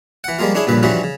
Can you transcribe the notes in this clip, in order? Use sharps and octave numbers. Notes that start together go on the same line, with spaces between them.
E3 F#5
F3 G3 G#3 A#3 F4
C#4 D4 E4 G#4
A#1 G2 A#2 C#3 B4
G2 E3 F3 G3 C#4 F#4
C#3